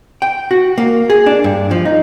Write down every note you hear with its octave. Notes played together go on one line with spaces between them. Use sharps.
G5
F#4
A#3
G#4
D4
G2
F3
D#4